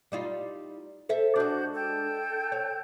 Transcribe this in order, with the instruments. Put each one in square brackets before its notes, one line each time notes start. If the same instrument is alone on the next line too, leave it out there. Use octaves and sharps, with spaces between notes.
[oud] G3 D#4 F4
A4 C5 E5
[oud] G#3 D4 [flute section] F#4 G6
[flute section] A4 G5 G6
[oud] C#5